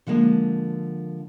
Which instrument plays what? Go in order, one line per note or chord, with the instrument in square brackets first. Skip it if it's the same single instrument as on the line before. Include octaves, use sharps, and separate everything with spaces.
[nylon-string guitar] D3 F3 G#3 A#3